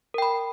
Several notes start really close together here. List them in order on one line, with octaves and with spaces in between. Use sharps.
A#4 G5 B5